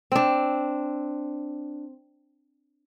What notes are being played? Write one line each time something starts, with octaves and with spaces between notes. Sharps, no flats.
C4 D4